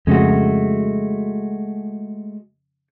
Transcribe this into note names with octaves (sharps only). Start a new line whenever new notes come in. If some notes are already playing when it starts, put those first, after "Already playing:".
F2 C#3 G#3 A3 F#4